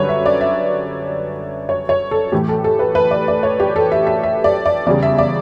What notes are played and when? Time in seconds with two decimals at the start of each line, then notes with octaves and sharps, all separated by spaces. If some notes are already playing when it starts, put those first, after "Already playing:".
Already playing: F#2 D3 G3 B4 C#5
0.09 E5
0.26 D5
0.41 E5
1.69 C#5
1.89 C#5
2.11 A4
2.32 A2 E3 A3 G4
2.49 A4
2.64 A4
2.79 B4
2.95 B4
3.11 D5
3.28 D5
3.43 C#5
3.60 G4
3.76 A4
3.92 E5
4.07 E5
4.23 E5
4.44 D5
4.66 D5
4.86 E2 C#3 G3 D5
5.03 E5
5.18 D5